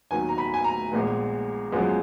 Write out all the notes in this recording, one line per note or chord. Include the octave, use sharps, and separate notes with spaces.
D#2 D#3 F#3 B3 G#5
A#5
B5
G#5
A#5
A#1 A#2 G#3 B3
F#2 F3 G#3 B3